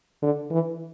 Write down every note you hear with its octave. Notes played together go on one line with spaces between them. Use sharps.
D3
E3